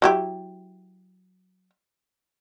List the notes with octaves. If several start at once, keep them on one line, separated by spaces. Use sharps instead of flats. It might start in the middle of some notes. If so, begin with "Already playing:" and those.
F#3 E4 G4